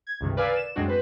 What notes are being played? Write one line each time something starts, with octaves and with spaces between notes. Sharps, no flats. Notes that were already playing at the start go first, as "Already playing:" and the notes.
G#6
C#2 G2 C3 D#3
A#4 B4 D5 F5 G#5 E6
E7
F#2 A2 G#3 C4 D4 F#4
B4 C5